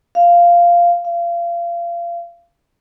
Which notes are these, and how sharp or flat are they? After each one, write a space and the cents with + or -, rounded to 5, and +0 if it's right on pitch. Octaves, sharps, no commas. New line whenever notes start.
F5 -10
F5 -30